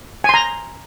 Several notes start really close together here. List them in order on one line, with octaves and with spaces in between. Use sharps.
G#5 C6 A#5